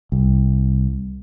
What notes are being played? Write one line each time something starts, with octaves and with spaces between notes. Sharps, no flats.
C2